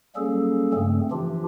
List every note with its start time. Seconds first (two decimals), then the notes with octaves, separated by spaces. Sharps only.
0.16 F#3 G3 A#3 C#4 G#4 A4
0.73 G2 C#3 A3 C4
1.11 E3 F3 D4 F4 G4